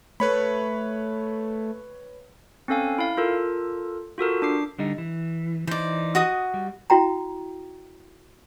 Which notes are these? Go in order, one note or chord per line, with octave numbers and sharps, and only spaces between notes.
A3 B4 C#5 B5
C4 C#4 A4 F5 G#5
E4 F5
F4 A4 A#4
F4 F#4 A4 A#4
D4 D6 C7
D3 G3 D#4
E3
E3 D#4 C5 D5
F#4 D#5 D#6
G3
E4 F#4 G5 A#5